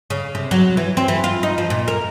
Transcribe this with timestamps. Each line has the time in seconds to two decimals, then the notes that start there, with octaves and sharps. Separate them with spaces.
0.10 C#3
0.35 C3
0.51 F#3
0.77 E3
0.97 C4
1.08 E3
1.24 F4
1.43 D#4
1.58 F3
1.70 A#2
1.88 A#4